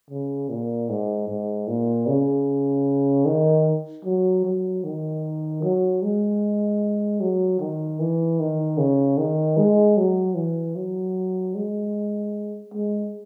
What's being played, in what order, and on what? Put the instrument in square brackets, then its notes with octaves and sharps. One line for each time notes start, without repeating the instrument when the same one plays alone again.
[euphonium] C#3
A#2
G#2
G#2
A#2
C#3
D#3
F#3
F#3
D#3
F#3
G#3
F#3
D#3
E3
D#3
C#3
D#3
G#3
F#3
E3
F#3
G#3
G#3